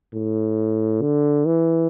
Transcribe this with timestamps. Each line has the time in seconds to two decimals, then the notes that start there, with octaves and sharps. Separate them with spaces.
0.14 A2
1.02 D3
1.46 E3